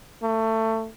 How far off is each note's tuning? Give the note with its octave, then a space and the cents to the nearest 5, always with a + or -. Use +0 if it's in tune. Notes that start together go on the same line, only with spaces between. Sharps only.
A3 +25